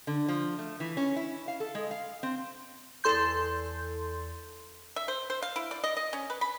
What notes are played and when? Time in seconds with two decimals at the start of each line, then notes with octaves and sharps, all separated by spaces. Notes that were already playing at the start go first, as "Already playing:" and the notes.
0.07 D3
0.28 F3
0.59 A3
0.80 E3
0.97 C#4
1.16 E4
1.48 F5
1.60 A4
1.75 G#3
1.91 F5
2.23 C4
3.04 E2 A4 C6 G6
4.96 E5
5.08 C5
5.30 C5
5.43 F5
5.56 E4
5.71 D5
5.84 D#5
5.97 D#5
6.13 C#4
6.30 B4
6.41 B5